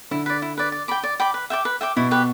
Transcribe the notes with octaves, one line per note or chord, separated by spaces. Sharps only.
D3 E4
B4 D5
E4
B4 D5
D5
G5 B5 D6
D5
G5 B5 D6
B4
E5 G5 D6
B4
E5 G5 D6
B2 E4
G4 B4